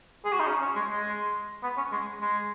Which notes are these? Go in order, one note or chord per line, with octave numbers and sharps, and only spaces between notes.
G#4
F#4
D#4
C#4
C#4
G#3
G#3
B3
C#4
G#3
G#3